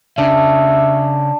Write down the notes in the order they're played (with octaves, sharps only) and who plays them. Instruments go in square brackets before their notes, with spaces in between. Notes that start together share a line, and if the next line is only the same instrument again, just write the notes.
[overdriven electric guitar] C#3 [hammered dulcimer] D4 [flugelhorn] E5